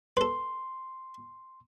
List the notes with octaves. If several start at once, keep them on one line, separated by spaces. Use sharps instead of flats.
A4 B4 C6